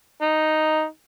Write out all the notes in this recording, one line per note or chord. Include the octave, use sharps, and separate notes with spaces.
D#4